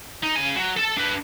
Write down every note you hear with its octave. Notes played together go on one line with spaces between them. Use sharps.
D#4
C#3 G#5
F#3
A4 A5
D4 B4